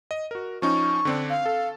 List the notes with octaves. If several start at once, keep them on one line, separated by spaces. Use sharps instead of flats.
D#5
F#4 A#4
F3 C#4 D#4 C#6
D3 C4 D4
F5
A4